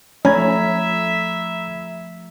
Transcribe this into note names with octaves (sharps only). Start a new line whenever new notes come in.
F3 A3 C#4 E5 A#5 B5 G#6